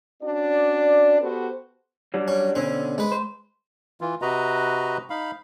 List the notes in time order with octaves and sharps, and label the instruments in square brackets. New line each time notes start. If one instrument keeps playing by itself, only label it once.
[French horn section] C#4 D4 F#4 D5
B3 F#4 G4 A4 B4 C5
[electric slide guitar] F#3 G3 D4
[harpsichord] C#4
[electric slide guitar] B2 D3 C#4 [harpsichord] C4
[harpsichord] G#3 B4
[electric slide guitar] C5
[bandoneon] E3 F4
C3 F#4 B4 D#5 A#5
D#4 F5 B5